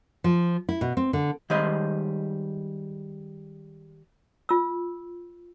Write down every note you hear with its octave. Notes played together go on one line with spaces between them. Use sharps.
F3
E4
B2
C4
D3
D#3 G3 G#3 C5 D#5
F4 E6